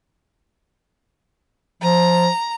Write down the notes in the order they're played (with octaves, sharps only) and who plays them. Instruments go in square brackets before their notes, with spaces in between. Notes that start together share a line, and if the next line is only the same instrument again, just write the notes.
[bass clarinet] F3 [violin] A#5